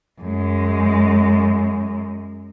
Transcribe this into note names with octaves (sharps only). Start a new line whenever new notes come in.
F#2 G#3